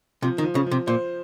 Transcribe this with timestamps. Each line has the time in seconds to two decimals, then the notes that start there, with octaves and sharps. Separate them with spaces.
0.22 C3 F3
0.38 D#3
0.44 F3
0.55 C#3
0.66 F3
0.71 C3
0.87 A#2 C5